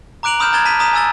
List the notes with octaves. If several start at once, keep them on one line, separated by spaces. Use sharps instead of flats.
A#5 D6 F#6 D7 F7 F#7
A#5 B5 D#6 F6 G6 E7
A#5 D#6 G#6 A6 E7 G7
A5 B6 D#7
A#5 D#6 B6 E7
G#5 D#6 E6 A6 G7